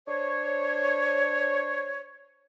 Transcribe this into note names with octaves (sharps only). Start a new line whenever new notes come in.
D4 C5 C#5